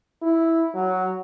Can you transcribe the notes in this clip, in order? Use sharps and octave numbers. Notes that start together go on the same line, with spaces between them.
E4
F#3